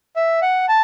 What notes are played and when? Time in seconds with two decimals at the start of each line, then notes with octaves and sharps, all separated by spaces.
0.16 E5
0.42 F#5
0.69 A5